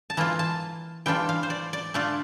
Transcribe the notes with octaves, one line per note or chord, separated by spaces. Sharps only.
A5
E3 A#3 F4 A#5
A5
E3 G3 D4 F4 G5
F5
C5
D5
D5
D3 A3 D4 F4 D5